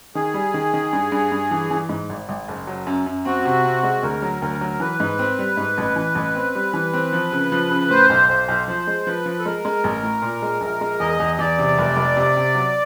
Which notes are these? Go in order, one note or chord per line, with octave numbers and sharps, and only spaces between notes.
D#3 G#4
G3
D#3
D#3
G2
G2
G2
E3
E3
G#2
G#1
G#1
F#1
F#3
F#2
F#2
C4 F#4
C3
C4
G#3
D2 A#4
F#3
D2 A#4
F#3
E3 B4
G#2
C4
G3
G#2
A1
E3
A1
C4
G3
E3
C4
F3
C#3
F3
C#3
A2 C5
B1
B1 C5
B1
F3 C5
G#3
F3 B4
F3
A4
G#3 A#4
G#3
A1
A2
A#2
G#3
A#1
G#3
E2 D#5
E2
E2 D5
C3
F1
F1
C3
C3
F#3